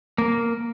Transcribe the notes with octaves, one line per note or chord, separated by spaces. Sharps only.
A#3